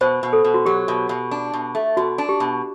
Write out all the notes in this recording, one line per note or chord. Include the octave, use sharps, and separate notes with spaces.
B2 C5
B2
A4
B2
F#4
F#3 G4
B2
B2
D4
B2
A3
B2 F#4
D4
G4
B2